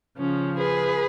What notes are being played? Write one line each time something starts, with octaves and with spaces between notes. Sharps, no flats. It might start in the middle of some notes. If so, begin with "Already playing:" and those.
C#3 F3 C#4
G#4 B4